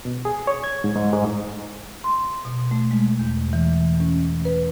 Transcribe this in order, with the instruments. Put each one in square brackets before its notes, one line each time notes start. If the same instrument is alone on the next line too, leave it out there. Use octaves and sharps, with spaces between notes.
[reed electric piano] B2
G#4
C#5
G#6
G#2
G#2
G#2
[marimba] C6
B2
A3
G#3
E2
E3
C#4
B4